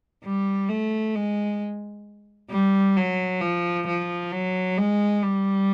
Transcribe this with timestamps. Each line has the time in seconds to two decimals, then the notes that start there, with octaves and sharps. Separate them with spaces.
0.25 G3
0.69 A3
1.15 G#3
2.51 G3
2.96 F#3
3.41 F3
3.87 F3
4.32 F#3
4.78 G#3
5.23 G3